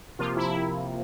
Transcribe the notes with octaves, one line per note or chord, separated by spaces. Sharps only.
C3 F3 A#3 F4
E4